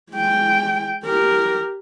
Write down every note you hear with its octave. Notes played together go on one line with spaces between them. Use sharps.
G#3 G5
G4 A#4